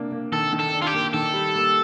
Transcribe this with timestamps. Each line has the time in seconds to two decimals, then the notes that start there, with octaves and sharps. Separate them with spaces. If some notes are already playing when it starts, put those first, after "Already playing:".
Already playing: C3 A#3 D4
0.12 A#3
0.32 D#3 A4
0.53 D#3
0.59 A4
0.73 D4
0.82 F4
0.87 G4
0.94 A#3
1.13 D#3 A4
1.33 G3
1.55 A#3